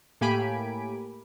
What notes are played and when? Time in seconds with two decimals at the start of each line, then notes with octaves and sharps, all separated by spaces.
0.21 A2 A#3 G4 G#5 B5 D7